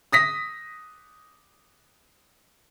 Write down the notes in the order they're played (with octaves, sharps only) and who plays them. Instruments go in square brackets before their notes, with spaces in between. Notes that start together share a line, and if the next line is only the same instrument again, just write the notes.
[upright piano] D#6 A#6 B6